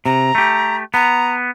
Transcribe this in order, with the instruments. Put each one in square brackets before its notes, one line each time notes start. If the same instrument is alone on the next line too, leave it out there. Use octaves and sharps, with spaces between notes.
[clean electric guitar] C3 [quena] A#5
[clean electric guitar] A3 G4
[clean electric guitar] B3 [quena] A#5